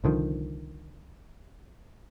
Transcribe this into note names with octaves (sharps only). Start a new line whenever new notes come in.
C2 D3 D#3 F3